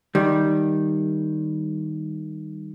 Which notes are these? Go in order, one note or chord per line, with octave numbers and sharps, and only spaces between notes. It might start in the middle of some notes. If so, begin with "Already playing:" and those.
D#3 G3